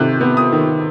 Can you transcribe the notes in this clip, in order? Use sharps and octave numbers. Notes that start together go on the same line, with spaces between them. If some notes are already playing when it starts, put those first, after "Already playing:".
Already playing: C3 D#3 F#6 G6
B3
D#6
D#3